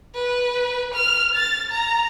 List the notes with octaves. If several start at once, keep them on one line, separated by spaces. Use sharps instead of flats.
B4
F6
A6
A#5